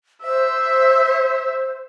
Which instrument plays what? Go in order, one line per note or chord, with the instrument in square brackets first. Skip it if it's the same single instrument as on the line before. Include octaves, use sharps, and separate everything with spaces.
[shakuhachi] C5 [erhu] E5